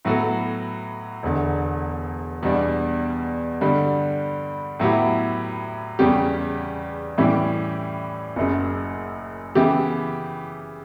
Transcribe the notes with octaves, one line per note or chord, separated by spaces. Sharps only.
A2 F#3 B3 F#4 A4
E1 E2 D3
E2 B2 G3 D4
G2 D3 G3
A2 F#3 B3 E4 G4
E2 C#3 G3 C#4 G4
A2 E3 G3 C#4 G4
F#1 F#2 C#3
C#3 E3 B3 E4 G4